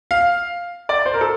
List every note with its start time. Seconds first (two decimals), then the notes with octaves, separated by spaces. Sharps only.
0.11 F5
0.89 D5
1.06 C5
1.14 A#4
1.21 A4